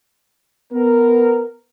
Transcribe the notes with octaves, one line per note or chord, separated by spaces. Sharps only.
B3 A#4